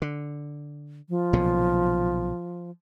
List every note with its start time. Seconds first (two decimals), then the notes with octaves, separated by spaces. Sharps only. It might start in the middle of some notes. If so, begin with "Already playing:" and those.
0.02 D3
1.09 F3
1.33 B1 A#2 C#3